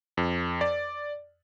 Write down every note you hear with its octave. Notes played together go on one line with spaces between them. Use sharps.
F2
D5